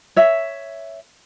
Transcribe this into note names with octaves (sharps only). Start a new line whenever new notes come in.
C#5 E5